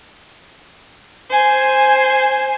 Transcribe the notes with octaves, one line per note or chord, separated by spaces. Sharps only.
C5 G#5